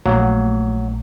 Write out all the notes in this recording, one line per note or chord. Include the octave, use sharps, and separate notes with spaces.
A#1 F#3 A3 A#3